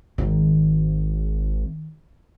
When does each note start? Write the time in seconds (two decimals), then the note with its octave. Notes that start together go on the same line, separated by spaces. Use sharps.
0.18 G#1 D#3